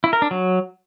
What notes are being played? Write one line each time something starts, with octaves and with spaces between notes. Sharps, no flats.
E4
A#4
D4
F#3